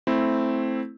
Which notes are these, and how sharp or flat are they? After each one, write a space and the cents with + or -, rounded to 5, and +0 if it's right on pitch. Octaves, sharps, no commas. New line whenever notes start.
A3 +0 C4 +0 E4 +0